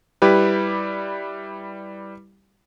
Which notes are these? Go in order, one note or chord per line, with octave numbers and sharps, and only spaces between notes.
G3 E4 G4 B4